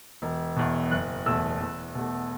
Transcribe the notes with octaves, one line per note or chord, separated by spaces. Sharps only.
E1
E2 B2
F#1 F#6
E2 B2 A3 E6
E2
B2 A3